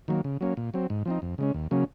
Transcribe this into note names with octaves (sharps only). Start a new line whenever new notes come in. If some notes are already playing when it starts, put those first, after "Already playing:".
D#3 F#3 A#3
C#3
F#3 A#3 C#4
A#2
F#3 C4
G#2
F3 C4 D#4
F2
C#3 G#3 C#4
D#2
C#3 F#3 A#3 C#4